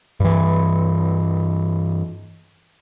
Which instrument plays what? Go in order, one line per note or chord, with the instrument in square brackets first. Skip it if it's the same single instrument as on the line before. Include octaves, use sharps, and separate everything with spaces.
[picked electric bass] G2 E3